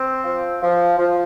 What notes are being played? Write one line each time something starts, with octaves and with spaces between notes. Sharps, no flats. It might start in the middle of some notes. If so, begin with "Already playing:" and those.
Already playing: C4
F3
F3
F3